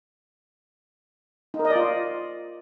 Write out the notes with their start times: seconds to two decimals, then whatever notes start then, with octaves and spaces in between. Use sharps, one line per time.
1.54 D#4
1.59 A#4
1.65 D#5
1.70 D5
1.76 F4